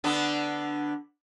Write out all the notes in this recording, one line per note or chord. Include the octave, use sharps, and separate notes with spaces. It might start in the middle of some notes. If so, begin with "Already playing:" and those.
D3 B3 D4